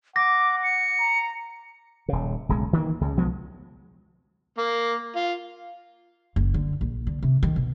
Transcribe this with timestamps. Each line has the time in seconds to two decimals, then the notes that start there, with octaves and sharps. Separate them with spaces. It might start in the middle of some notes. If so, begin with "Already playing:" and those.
0.16 F#5 D6 A#6
0.64 C#7
0.99 A#5
2.08 D#1 C#3
2.49 D1 B1 C#3 G#3
2.73 D#3 E3 G3 A#3
3.01 C#2 C#3
3.17 B1 F3 G#3 B3
4.58 A#3
5.16 F4
6.36 F#1
6.54 D3
6.81 A#1
7.07 D3
7.23 C3
7.43 D#3
7.56 B2